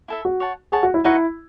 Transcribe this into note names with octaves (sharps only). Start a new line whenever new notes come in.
E4 A4 E5
F#4
C#5 F#5 A5
G#4 C#5 F#5 A5
F#4
E4
D#4 E4 F#4 B4 F#5